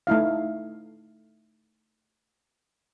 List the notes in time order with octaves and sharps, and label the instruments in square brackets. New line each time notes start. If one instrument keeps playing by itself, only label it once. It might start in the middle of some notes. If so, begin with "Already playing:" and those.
[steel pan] A3 D#4 E4 F5